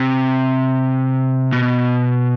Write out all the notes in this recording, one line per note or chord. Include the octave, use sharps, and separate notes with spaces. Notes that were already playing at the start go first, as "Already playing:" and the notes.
Already playing: C3
B2